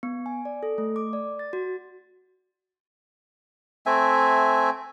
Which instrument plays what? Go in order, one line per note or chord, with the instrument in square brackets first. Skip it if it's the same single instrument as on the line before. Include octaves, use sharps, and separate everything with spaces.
[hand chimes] B3
G#5
D5
A4
A3
D6
D5
A6
F#4
[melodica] A3 C4 E5 G#5